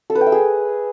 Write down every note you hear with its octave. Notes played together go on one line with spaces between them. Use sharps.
A4
B4
G5
E5
G#4